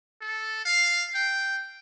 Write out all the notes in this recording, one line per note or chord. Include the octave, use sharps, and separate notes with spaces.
A4
F5
G5